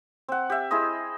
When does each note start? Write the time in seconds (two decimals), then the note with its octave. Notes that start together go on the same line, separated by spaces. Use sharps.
0.28 C4 F#5
0.50 G4 E5
0.71 E4 G#4 C5 D#5